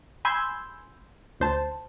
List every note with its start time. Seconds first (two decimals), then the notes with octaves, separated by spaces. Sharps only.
0.25 G#5 B5 C6 E6 G6 G#6
1.40 D2 C5 A5